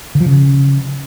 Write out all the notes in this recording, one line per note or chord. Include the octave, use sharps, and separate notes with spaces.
D3
F3
C#3